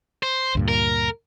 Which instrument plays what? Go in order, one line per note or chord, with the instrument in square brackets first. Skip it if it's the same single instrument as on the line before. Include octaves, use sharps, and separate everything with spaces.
[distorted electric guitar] C5
[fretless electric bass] D2 G2 A#2
[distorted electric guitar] A#4